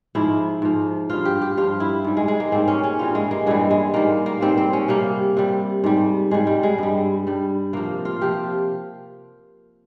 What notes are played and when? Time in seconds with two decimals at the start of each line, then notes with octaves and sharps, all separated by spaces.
0.15 G#2 F3 E4
0.62 G#2 F3
1.10 G2 F3 F4
1.25 G4
1.42 G4
1.57 G2 F3 F4
1.80 E4
2.04 G#2 G3
2.17 G#3
2.28 G#3
2.40 A#3
2.52 G#2 G3 C4
2.68 C#4
2.84 C#4
2.99 G2 E3 G3 F4
3.15 G#3
3.31 A#3
3.46 G2 E3 G3 G#3
3.71 G#3
3.94 G#2 G3 A#3
4.26 A#3
4.41 G#2 G3 C4
4.57 C4
4.73 C#4
4.88 C3 G3 A#3
5.37 C3 G3
5.84 G#2 G3
6.31 G#2 G3 G#3
6.47 G3
6.63 G#3
6.78 G2 G3
7.27 G2 G3
7.73 C3 F3 A#3
8.05 F4
8.21 C3 F3 G4